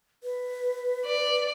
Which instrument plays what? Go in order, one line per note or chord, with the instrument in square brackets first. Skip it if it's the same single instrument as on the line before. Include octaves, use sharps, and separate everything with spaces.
[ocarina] B4
[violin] D5